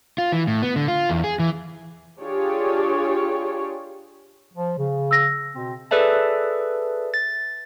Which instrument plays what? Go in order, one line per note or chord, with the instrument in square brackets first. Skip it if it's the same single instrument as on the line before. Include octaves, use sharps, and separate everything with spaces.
[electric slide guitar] F4
E3
A2
B3
D3
F4
E2
G#4
E3
[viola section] D4 F4 G4 G#4 C#5
[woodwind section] F3
C#3
[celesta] E6 A#6
[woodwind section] B2 C4
[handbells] G#4 A4 B4 D5 E5 A5
A6